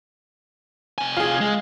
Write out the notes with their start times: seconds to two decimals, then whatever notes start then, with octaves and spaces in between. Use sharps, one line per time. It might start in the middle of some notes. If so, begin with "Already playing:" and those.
0.98 C3 G#5
1.17 F4 G#4
1.41 G#3